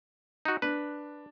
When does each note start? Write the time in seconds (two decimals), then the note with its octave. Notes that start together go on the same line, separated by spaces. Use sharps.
0.45 D#4 F#4
0.62 D4 B4